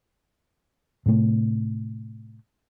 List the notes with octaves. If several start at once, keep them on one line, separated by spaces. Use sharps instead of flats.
A2 C3 A3